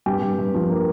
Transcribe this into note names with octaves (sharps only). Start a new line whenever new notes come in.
G2 G4
G2
G2
F3
A#3